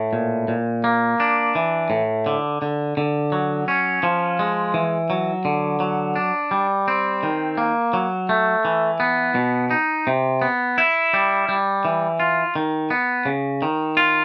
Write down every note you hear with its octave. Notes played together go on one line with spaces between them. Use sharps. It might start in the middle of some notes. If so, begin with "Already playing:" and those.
Already playing: A2
A#2
A#2
A#3
D4
E3
A2
D3
D3
D3
F#3
C#4
F3
G#3
E3
F#3
D3
F#3
D4
G3
C4
D#3
A#3
F#3
A3
E3
B3
B2
D#4
C3
B3
E4
G3
G3
E3
F4
D#3
B3
C#3
D#3
F4